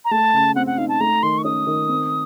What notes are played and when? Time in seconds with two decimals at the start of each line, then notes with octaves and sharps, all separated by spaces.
0.05 A#5
0.11 A3 A5
0.34 C#3
0.56 C4 F#5
0.67 F#5
0.78 D#4 F5
0.89 A5
1.00 A3 A#5
1.23 D#3 C6
1.38 C#6
1.45 C#4 D#6
1.67 D#3
1.89 C4